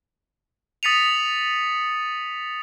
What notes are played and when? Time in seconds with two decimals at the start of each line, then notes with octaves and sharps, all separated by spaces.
0.83 D#6 A6 B6 C#7 D#7 F7